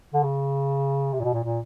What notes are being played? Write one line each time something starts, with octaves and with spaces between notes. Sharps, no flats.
D3
C#3
C3
A#2
B2
A#2
A#2